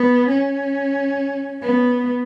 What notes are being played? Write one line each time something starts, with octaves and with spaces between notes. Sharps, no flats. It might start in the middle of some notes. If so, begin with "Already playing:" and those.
Already playing: B3
C#4
B3